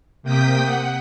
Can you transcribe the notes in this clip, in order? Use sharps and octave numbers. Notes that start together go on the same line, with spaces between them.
C3 A#3 G5 D#6 G6 B6
F#5